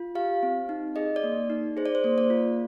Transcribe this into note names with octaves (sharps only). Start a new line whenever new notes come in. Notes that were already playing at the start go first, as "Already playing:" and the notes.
Already playing: F4
G4 F5
C4
D#4
G#4 D#5
D5
A#3
D#4
G#4 C5
D5
C5
A#3
D5
F4